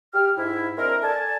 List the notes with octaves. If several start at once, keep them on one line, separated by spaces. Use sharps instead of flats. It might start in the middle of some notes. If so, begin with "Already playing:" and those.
G4 F6
G#2 E4
G#3 C4 D4 E4 A#4
A4 D5 G#5 A5